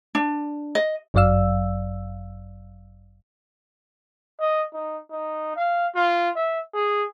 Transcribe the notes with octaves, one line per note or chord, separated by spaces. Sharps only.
D4
D#5
G1 F#2 F#3 D5 F5 E6
D#5
D#4
D#4
F5
F4
E5
G#4